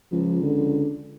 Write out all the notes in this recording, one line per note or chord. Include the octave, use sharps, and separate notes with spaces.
C#2 F3
D3